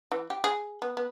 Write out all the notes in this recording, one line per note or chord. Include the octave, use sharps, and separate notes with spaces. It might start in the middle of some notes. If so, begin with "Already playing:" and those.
E3
G4
G#4
B3
B3